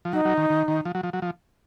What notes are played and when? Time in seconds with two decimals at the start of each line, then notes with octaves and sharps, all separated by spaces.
0.05 F3
0.13 F#3 D#4
0.25 F#3
0.37 D#3
0.50 D#3
0.68 D#3
0.85 F3
0.95 F#3
1.03 F3
1.13 F#3
1.22 F3